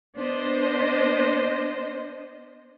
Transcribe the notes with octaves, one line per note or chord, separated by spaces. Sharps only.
B3 D4 C5 D#5